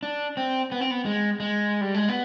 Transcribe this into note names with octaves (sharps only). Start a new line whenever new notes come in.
D4
C4
B3
C4
B3
G#3
G#3
G3
G#3
B3